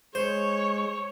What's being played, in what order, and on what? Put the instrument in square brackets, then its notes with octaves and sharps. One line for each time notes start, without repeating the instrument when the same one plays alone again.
[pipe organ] G#3 [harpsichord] C5 [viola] C#5